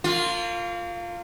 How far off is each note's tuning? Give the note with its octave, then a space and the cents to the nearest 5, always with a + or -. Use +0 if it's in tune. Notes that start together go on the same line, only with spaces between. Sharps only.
A#3 -40 F4 +0